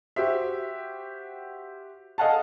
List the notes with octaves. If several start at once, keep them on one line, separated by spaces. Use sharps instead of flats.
F#4 G4 C5 E5
A4 D#5 F5 F#5 G#5 A5